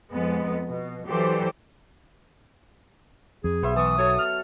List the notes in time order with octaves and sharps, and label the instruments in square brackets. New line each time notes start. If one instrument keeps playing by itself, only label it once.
[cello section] F2 G#3 B3
B2
E3 F#3 G4 A4 C5 D5
[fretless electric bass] F2 [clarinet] G#4
[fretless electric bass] B1 [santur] B3 C5 E5
[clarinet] E3 [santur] A5 C#6 [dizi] D#6
[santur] F#3 A4 A5 [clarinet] C#5
[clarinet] F6